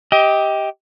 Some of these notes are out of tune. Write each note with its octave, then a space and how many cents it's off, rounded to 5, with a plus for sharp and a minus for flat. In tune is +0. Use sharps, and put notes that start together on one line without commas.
G4 +0 D#5 +30